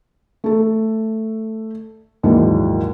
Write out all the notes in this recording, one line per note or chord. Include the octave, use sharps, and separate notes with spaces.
A3 A4
A#1 D#2 G#2 E3 F#3 G#3